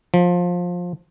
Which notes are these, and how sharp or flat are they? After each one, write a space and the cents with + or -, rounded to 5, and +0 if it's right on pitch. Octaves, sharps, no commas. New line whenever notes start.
F3 +20